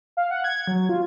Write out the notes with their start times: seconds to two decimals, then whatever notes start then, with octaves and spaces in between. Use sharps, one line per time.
0.17 F5
0.31 F#5
0.44 G#6
0.67 F#3
0.89 F4